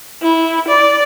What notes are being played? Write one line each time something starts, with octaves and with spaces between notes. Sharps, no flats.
E4
D5